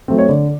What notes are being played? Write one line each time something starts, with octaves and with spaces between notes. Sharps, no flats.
F#3 A3 C4
C#5
D3 D5